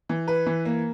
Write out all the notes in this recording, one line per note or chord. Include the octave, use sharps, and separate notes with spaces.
E3
B4
E3
A#3